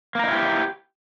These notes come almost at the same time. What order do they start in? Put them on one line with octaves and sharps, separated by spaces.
A#3 A#4 D#4 E4 G4